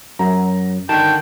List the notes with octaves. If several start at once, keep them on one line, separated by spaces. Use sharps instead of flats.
F#2 A#5
D3 D#3 G5 A5